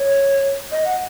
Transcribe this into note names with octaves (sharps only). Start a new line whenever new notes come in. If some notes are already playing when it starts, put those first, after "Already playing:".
Already playing: C#5
D#5
F#5